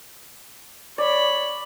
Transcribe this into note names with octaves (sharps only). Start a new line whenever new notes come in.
C#5 D5 B5